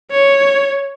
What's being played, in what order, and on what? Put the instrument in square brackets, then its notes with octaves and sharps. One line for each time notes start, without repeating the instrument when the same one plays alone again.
[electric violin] C#5